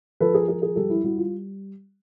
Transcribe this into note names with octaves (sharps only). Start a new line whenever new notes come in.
F3 A4 B4
G#4 A#4
F3 G#4 A#4
G#4 A#4
G3 G4 A4
E4
G3 E4 F#4
F4